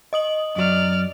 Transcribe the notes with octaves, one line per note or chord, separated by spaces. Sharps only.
D#5 D#6 F#7
F#2 F#3 D5 F6